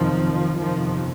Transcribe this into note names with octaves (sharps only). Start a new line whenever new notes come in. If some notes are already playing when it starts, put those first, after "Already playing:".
Already playing: F#1 F2 C3 D#3 F3
G1 F2 C3 D#3 F3